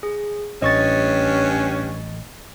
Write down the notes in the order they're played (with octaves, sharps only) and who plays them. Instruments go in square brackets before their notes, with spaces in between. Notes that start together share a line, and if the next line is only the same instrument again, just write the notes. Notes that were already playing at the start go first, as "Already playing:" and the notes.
[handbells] G#4
[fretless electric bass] A1 [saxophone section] G2 C#4 [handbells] D#5 C#6 A6